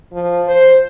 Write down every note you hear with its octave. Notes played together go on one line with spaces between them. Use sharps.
F3
C5